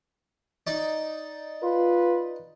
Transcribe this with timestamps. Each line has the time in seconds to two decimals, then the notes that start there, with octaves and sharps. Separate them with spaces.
0.67 D#4 D5
1.63 F4 B4